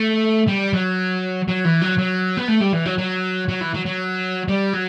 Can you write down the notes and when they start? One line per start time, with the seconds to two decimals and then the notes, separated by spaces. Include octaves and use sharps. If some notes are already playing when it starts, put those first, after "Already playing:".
Already playing: A3
0.48 G3
0.73 F#3
1.48 F#3
1.65 E3
1.81 F#3
1.98 F#3
2.37 B3
2.48 A3
2.61 G3
2.73 E3
2.85 F#3
2.98 F#3
3.48 F#3
3.61 E3
3.74 F#3
3.86 F#3
4.48 G3
4.73 F#3